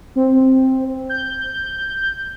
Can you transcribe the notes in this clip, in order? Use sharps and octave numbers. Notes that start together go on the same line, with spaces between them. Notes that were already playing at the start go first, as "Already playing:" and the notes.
C4
G6